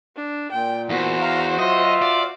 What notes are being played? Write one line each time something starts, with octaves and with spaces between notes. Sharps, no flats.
D4
A#2 G5
E2 F#4 C5
F5 A#5
F#3 F4 D#5 E5
D5 F5